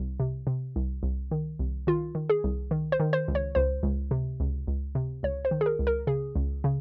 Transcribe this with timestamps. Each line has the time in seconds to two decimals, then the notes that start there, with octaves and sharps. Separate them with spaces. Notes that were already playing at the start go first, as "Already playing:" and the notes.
Already playing: C2
0.20 C3
0.47 C3
0.76 C2
1.03 C2
1.31 D#3
1.59 C2
1.87 D#3 F4
2.15 D#3
2.30 G#4
2.44 C2
2.71 D#3
2.92 C5
3.00 D#3
3.13 C5
3.28 C#2
3.35 C#5
3.55 C#2 C5
3.83 C#2
4.11 C3
4.40 C#2
4.67 C#2
4.95 C3
5.23 C#2 C#5
5.45 C5
5.51 D#3
5.61 G#4
5.66 A#4
5.79 C#2
5.87 A#4
6.07 C#3 G#4
6.36 C#2
6.64 C#3